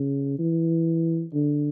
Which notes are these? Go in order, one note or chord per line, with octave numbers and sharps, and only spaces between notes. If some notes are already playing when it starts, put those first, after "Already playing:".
Already playing: C#3
E3
D3